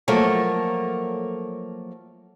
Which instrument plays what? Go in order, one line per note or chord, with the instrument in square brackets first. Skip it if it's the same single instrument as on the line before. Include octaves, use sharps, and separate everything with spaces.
[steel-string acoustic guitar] F3 F#3 A3 A#3 A#4 C#5